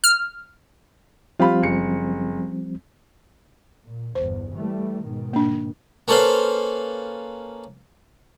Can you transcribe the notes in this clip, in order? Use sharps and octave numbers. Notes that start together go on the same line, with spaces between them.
F6
F3 G3 C4 F4 G4 B5
F#1 C#7
A#2
G1 E2 C5
E3 G3 A3
G#2 B2 D#3
A#3 D4
A#3 C#4 A4 B4 C5 F5